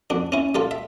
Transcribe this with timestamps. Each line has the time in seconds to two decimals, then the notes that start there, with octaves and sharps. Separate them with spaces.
0.10 F2 D4
0.32 C#4 E4
0.55 G3 F4 A4
0.71 E5